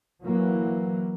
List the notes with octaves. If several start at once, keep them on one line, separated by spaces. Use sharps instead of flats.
E3 F#3 A#3